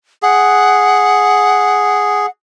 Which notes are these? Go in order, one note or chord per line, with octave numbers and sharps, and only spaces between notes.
G#4 F#5